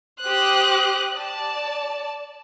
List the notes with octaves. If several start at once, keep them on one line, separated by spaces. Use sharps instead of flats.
G4 C5 D#6 F#6
D5 A5